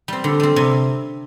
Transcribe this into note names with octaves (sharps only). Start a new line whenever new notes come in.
G3 C4
D3
G3 C4
C3